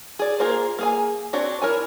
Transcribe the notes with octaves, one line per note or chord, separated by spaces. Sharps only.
G#4 D5
A#3 F4 G#4 A#4 C5
A#3 G#4 G#5
C4 D4 F#4 C#5
E4 A#4 C#5 G#5